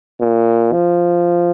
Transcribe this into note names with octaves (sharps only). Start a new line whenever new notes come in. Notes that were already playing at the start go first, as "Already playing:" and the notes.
A#2
F3